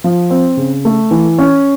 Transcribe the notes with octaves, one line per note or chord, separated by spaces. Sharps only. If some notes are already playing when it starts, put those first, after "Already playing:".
F3
C4
C#3
A3
E3
C#4